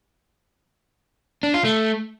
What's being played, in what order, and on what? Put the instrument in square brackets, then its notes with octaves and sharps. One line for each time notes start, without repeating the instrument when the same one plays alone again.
[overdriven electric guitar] D4
F4
A3